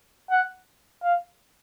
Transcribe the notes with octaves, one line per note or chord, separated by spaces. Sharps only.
F#5
F5